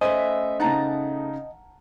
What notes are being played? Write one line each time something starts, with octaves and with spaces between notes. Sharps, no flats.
A3 C#4 B4 C5 D#5 E5 G#5
C#3 D#4 F#5 A5 A#5